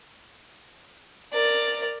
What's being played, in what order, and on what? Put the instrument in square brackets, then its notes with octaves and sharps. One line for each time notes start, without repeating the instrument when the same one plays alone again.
[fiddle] A#4 D5